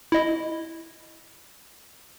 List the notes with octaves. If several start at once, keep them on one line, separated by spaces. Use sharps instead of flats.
E4 D#5